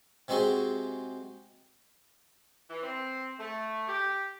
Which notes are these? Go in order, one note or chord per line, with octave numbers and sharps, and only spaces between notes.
C3 G#3 C4 F#4 G#4
E3
C4
A3
G4